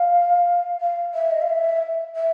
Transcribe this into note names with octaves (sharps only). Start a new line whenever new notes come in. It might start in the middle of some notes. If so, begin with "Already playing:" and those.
Already playing: F5
F5
E5
D#5
F5
E5
E5